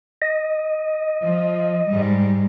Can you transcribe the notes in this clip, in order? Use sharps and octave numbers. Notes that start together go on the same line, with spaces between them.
D#5
F3
G#2 G3